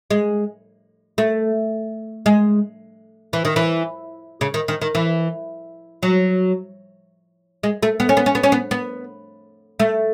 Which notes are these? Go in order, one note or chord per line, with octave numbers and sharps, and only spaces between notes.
G#3
A3
G#3
E3
D#3
E3
C#3
D#3
D#3
D#3
E3
F#3
G#3
A3
B3
C#4
B3
C#4
B3
C#4
B3
B3
A3